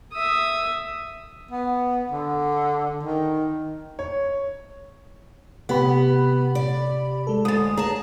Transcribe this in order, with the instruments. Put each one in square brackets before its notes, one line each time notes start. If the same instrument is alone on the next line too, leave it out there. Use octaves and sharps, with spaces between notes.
[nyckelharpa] E5 D#6
[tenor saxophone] B3
D3
D#3
[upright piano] C#5
[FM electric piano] C3 G4 B5 [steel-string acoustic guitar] B3
[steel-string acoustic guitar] D5
[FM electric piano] G#3 A4
[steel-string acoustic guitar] D2 G#3 [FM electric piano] D#6 A6
[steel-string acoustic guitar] G#4 A5 [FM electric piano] A#5